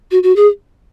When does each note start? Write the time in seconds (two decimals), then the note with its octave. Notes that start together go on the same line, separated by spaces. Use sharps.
0.11 F#4
0.23 F#4
0.36 G#4